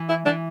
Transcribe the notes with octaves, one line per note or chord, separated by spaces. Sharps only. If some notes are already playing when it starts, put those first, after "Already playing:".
Already playing: E3
E4
E3 D4